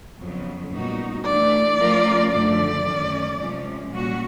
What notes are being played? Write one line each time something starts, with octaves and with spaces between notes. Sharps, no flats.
F2 C#3 F#3 B3
A#2 G3 B3 D#4 F#4
E3 A3 D4 D5
F3 A3 C#4 F4 A#4
F#2 D3 F3 A3 D5
F#2 D#3 F#3 A3 C#4
F2 C3 F3 G#3 C#4
A#2 G3 A#3 C#4 F#4